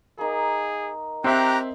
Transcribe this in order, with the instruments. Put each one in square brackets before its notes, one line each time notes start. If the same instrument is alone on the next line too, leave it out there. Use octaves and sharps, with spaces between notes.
[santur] A#3 D#4 [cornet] G#4
[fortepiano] C4 E5 [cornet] G4 [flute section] A#5 F#6